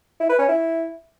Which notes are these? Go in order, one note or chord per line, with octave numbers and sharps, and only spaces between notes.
E4
B4
C#4
E4